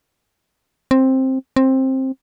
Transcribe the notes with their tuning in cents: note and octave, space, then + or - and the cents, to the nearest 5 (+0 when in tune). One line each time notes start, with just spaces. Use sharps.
C4 +10
C4 +15